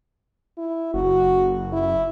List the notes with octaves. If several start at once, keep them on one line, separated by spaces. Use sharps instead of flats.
E4
F#1 F#4
E4